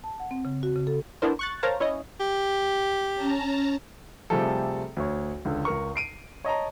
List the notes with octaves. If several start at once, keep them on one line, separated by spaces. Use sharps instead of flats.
A5
F#5
C4
C#3
F#4
C#3
A4
B3 D4 E4 A#4 C5
C#6 F#6 A6
A#4 C5 C#5 F5 A5 A#5
C#4 E4 C#5 D#5
G4
C#4 A5 A#5
C3 F3 G3 A3 G#4 A4
D2 C#5
C#2 D3
C#2 A#4 C#6
C7 D7 D#7
C#5 D#5 A5 A#5